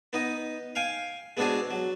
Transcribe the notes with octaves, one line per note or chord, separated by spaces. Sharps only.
B3 D#4 D#5
F5 G5 G#5
G#3 B3 C4 D4 F#4 G#4
F#3